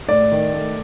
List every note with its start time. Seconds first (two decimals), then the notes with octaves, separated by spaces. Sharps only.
0.09 A2 D5
0.32 D#3
0.53 A3